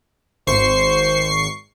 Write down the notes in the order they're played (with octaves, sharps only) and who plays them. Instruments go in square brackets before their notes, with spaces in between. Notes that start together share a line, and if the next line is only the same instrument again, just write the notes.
[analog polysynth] G#1 C#6 C7 [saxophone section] C5